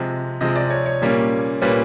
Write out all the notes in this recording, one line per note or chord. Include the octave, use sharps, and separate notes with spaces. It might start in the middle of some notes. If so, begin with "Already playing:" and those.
Already playing: C3 F3 G#3
C3 F3 G#3 D#5
D5
C#5
C#5
A#2 G3 A#3 C#4
A#2 G3 A#3 C#4 B4